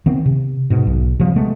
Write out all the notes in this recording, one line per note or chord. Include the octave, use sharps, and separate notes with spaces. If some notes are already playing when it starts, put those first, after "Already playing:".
D#3 B3 C4
C3
G#2 B2
B1
C3 F3 G3
G#3 A3 B3